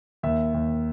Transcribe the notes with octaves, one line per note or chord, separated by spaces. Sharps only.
D#2 E5
D#2